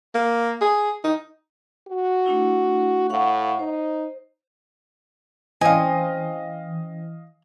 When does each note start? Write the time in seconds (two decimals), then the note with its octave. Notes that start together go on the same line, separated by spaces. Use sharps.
0.15 A#3
0.61 G#4
1.04 D#4
1.88 F#4
2.26 A3 D4 E4
3.10 A2 F5 F#5 C#6
3.59 D#4 C5
5.61 E3 C4 C#4 D#5 F5 G#5 D#6